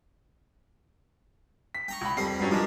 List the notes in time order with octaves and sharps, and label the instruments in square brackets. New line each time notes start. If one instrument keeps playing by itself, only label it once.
[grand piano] B6
[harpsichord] G5 A#5 C#6
[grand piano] C#2 B5
[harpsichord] F2 G3 A#4 [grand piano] C7
[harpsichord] G2 [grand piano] F#3 G3 C#4
[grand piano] F3 D4 A#4 [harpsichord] G3 G#3